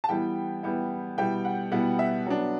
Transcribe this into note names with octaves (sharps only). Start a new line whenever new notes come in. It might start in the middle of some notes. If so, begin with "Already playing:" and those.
A5
E3 G3 B3 E4 G5
E3 G3 B3 E4
B2 G3 B3 E4 G5
F#5
B2 G3 B3 E4 F#5
E5
F#3 B3 D4